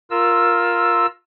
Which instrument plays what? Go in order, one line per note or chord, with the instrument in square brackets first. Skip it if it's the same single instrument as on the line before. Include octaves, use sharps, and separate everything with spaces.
[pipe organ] F4 A#4 E6